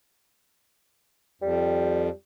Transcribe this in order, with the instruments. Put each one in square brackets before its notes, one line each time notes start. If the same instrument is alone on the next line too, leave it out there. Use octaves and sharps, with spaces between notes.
[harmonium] F2 [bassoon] G3